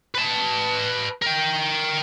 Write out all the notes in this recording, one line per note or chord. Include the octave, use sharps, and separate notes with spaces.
B4 A5
A#4 G5